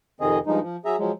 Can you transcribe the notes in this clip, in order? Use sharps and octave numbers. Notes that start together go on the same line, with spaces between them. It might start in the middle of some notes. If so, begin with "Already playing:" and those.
F2 C3 D#3 C4 G#4 D#5
G2 F3 G#3 D#4
F3
F#3 G#4 E5 A#5
F3 F#3 G#3